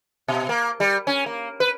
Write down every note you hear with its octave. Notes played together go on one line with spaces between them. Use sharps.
B2
A#3
G3
C#4
A#3
B4